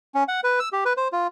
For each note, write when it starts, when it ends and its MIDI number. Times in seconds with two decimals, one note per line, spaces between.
0.15 0.24 61
0.28 0.40 78
0.44 0.59 71
0.60 0.69 88
0.73 0.84 67
0.85 0.93 71
0.97 1.08 72
1.13 1.27 65